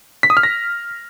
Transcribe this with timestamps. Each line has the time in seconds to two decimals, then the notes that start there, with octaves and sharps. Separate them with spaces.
0.23 B6
0.30 D#6
0.37 F6
0.43 A#6